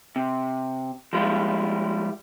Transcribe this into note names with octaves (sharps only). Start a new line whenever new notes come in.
C3
F3 G3 G#3 E4 F4